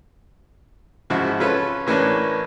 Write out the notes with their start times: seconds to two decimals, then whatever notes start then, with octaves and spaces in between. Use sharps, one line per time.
1.10 G#2 C#3 F3 E4 F#4
1.40 C#4 F4 A4 B4
1.87 A2 E3 A#3 C#4 D4